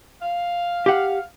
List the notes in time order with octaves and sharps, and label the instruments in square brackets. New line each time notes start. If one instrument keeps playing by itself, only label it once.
[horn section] F5
[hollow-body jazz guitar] G4 F#5